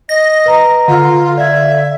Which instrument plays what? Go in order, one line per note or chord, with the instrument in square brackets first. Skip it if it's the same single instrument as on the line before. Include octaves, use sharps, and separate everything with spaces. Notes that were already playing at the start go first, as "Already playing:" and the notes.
[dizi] D#5 [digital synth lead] A#6
[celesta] B4 A#5
[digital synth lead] D3 [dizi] F4
[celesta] D5 F5 G#6 [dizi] E5